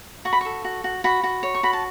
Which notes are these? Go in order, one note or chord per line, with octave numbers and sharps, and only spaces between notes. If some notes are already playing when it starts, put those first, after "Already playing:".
F#4 C#6
B5
A4 C#6
F#4
F#4
F#4 B5
F#4
C#5
C#6
F#4 B5
A5